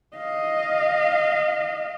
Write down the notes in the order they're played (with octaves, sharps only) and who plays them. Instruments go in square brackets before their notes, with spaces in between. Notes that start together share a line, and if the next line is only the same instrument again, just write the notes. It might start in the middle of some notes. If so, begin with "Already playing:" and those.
[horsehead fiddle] D#5 F5